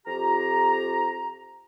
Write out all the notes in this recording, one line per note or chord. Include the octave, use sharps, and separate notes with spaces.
F2 F4 G4 A#5